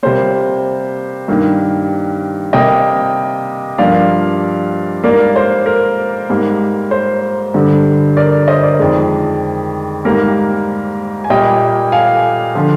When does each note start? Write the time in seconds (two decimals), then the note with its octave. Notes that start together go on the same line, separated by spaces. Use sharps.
0.03 C3 G3 A#3 C5
1.28 G2 D#3 A#3
2.53 C3 G3 A#3 D#5 G5
3.78 G2 F3 A#3 D5 F5
5.04 G#2 G3 A#3 A#4 D5
5.36 C5
5.66 A#4
6.30 G#2 G3 A#3
6.91 C5
7.54 G2 D3 G3
8.17 A#4 D5
8.48 C5 D#5
8.64 A#4 D5
8.79 F2 D#3 G#3
10.05 G#2 G3 A#3 A#4
11.24 G#5
11.30 A#2 G3 A#3 D#5 G5
11.92 F5 G#5
12.55 D3 F3